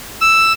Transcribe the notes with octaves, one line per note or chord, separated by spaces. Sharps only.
E6